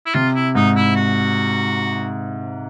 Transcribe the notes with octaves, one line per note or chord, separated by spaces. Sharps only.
E4
C3 F4
E4
G#2 D#4
E4
F#4